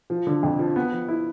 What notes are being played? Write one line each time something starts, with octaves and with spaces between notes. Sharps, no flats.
F3
D3
F2
F3
B3
F3
E4